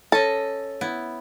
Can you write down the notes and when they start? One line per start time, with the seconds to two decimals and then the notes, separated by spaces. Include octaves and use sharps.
0.12 C#4 A4 D#5
0.81 B3 E4